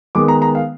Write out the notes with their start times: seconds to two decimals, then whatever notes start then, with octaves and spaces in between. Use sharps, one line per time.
0.15 D#3 G#3 B3 D6
0.28 A#5
0.42 A#5
0.55 F5